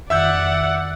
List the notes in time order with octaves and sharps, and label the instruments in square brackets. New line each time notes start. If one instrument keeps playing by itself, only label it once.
[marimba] F2 D#3 [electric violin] D5 F#5 [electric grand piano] E5 E6 G6